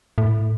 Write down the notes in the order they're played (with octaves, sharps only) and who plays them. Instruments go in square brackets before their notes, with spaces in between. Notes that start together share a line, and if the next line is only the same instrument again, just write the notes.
[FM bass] A2